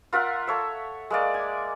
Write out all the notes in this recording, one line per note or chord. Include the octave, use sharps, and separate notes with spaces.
F4 A#4 E5 F#5
A4 C#5 E5
G#3 A#3 D5
G#5